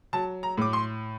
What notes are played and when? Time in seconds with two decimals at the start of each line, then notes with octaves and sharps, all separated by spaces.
0.13 F#3 A5
0.43 A#5
0.58 A2 D6
0.73 C6